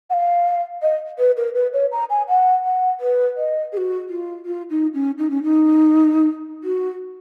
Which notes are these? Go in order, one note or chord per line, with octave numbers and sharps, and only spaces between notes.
F#5
F5
D#5
B4
A#4
B4
C#5
A#5
G#5
F#5
F#5
B4
D#5
G#4
F#4
F4
F4
D#4
C#4
D#4
C#4
D#4
F#4